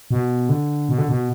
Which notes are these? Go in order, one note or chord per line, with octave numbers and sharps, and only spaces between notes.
B2
D3
B2
D3
B2